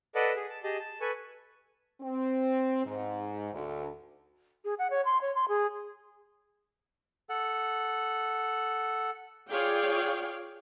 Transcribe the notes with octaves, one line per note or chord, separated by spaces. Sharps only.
A4 B4 D5 D#5 F#5 A5
G#4
A5
G4 G#4 D#5 A5
A5
A4 B4 G#5 C#6
C4
G#2
D2
G#4
F#5
C#5
C6
C#5
C6
G#4
A4 F#5
F4 G#4 C#5 D5 F5 G5